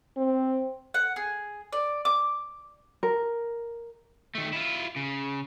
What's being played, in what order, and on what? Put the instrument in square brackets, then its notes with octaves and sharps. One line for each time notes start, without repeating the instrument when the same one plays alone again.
[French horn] C4
[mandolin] F#5
G#4
D5
D6
[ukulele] A#4
[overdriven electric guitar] D#3 A3
E4 F4
C#3